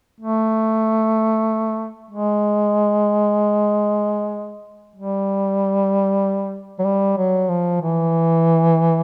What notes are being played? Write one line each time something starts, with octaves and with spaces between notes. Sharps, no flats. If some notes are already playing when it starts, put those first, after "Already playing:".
A3
G#3
G3
F#3
G3
F#3
F3
E3